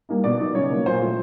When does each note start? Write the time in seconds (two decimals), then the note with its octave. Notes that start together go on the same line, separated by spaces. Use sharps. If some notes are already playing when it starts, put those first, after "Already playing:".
0.09 G3 A#3 D#4
0.24 B2 D5
0.40 F#3 B3 D#4
0.55 C#3 C#5
0.70 F#3 A#3
0.86 A#2 C5
1.01 F3 A3